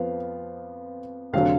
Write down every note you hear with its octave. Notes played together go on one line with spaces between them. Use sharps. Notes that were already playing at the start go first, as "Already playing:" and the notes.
Already playing: F2 F3 B3 F5
F1 D3 F#3 F5